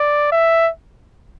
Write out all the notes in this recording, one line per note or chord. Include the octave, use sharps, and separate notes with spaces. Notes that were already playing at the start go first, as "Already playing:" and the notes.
Already playing: D5
E5